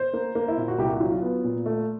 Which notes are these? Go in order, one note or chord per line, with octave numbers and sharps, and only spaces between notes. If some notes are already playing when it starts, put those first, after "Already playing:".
Already playing: C5
A#3
A#3
E4
A#2 F4
F#4
C2 G4
F#4
F#3 F4
F4
B3
A#2
A3